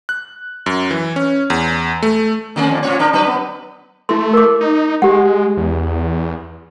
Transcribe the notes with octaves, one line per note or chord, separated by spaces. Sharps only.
F#6
F#2
E3
C#4
E2
A3
D#3 A3 C#4
F2 A#2
A#2 F4 C#5
D4 A#4
F#3 D4 B4
B3
A3 E4 C6
A#4 D6
D#4
G#3 G4 F#5
E2